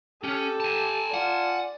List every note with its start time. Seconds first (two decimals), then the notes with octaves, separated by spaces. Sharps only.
0.24 C#4 G4 A4
0.60 G#5 A5
1.14 F4 D5 F#5